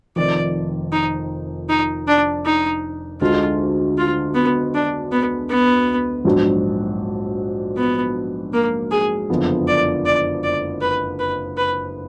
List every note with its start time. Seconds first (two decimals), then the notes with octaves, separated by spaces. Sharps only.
0.16 F1 F2 D#3 D5
0.92 D#4
1.69 D#4
2.07 D4
2.45 D#4
3.21 D2 D3 G#3 D#4 F4
3.98 F4
4.34 B3
4.74 D4
5.11 B3
5.49 B3
6.25 A#1 G#2 F#3 D4 F#4
7.77 B3
8.53 A#3
8.91 G#4
9.30 F#1 F2 D3 F3 B3
9.67 D5
10.05 D5
10.43 D5
10.81 B4
11.19 B4
11.57 B4